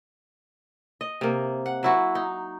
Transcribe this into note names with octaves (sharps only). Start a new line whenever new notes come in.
D#5
C3 A#3
F#5
F#3 E4 F#4
D#4